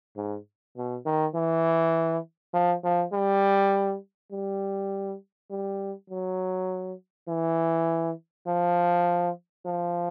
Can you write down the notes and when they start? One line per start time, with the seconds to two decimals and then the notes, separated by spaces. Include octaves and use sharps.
0.16 G#2
0.77 B2
1.06 D#3
1.35 E3
2.54 F3
2.84 F3
3.13 G3
4.32 G3
5.51 G3
6.10 F#3
7.28 E3
8.47 F3
9.66 F3